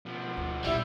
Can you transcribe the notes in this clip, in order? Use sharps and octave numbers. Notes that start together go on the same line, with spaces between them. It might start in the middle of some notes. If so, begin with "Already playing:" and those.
B2 F3
D2
A#1 A#2 G3 E4